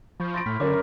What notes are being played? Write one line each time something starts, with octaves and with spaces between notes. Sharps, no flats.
F3 B5 C#6 G6
B5 C6 A6 A#6 D7
A2 B5 F6 B6
F#2 D3 C#4 A#4 D6 A6